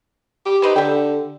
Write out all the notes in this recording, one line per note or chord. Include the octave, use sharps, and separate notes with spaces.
G4
D#4 B4 C5
D3 G4 G5